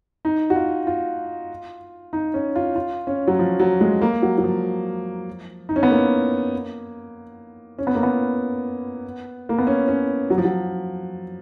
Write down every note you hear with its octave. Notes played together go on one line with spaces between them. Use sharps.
D#4
F#4
F4
F4
D#4
C#4
F4
F4
C#4
F#3
F3
F#3
G#3
A#3
F#3
F#3
F3
D#4
C#4
B3
A#3
C#4
B3
A#3
B3
A#3
B3
C#4
C#4
F#3
F3
F#3